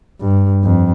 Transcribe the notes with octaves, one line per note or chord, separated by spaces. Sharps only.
G2
F2